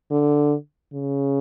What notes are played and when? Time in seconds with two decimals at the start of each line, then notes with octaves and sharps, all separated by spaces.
0.11 D3
0.93 C#3